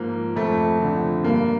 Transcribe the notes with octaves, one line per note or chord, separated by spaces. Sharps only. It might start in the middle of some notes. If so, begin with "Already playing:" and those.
Already playing: G#2 F3 A#3
F2 A3
D3 F3
G2 A#3